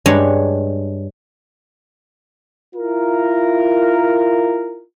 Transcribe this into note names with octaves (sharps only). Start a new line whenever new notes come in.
G2 G#3 D4 C#5
E4 F4 A#4